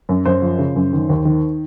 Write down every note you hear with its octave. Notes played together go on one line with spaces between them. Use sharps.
F#2
F#2 C5
F3
C#3
F#2
D#3
D#2
D#3